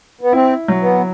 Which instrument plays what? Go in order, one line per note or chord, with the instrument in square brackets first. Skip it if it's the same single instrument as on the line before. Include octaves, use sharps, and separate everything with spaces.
[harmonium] B3
[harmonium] C4 [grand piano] E4
[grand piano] F#3
[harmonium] B3